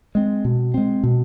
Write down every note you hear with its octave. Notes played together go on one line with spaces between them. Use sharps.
G#3 C4
B2
G#3 C4
B2